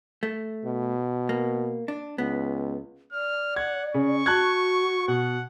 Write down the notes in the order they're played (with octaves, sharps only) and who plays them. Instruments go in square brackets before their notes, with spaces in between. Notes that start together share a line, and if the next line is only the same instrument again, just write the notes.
[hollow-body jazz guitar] A3
[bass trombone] B2
[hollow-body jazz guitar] A#3
D4
[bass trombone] C#2 [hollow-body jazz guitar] B3
[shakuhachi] D5 [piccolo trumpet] F6
[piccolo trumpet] F#5 [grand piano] G#6
[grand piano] C#3 [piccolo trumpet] C#6
[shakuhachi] F#4 [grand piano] A5 F#6 G#6
[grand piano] B2 [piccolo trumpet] F#5